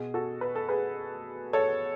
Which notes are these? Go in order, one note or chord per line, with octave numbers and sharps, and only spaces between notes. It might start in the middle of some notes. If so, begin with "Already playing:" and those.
Already playing: B2 G#4
F#4 A4
B4
A4
G#4 B4
A4 C#5